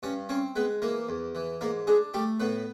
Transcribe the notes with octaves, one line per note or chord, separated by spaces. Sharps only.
G2 C#4 C#5
C4 C#4 C#5
G#3 B3 B4
E3 A#3 A#4
E2
E3
G#2 A#3 A#4
G#3 D4 G#4
G3 A3 G4
A2 B3 B4